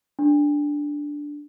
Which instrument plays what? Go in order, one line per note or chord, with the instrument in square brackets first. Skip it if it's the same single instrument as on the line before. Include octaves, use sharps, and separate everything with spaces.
[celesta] D4